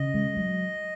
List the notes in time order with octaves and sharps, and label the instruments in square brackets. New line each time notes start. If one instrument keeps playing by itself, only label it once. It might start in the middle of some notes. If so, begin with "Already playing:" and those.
Already playing: [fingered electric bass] C#3 [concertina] D#5
[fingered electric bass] G#3
F#3